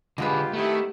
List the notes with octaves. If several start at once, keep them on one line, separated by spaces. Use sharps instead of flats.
B2 D3 G#3 B3 F4 G4 G#4 B4
D#3 A3 C4 E4 G4